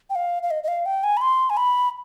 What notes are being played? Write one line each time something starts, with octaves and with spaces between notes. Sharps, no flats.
G5
F5
F5
D#5
D#5
F5
G5
G#5
B5
C6
G#5
B5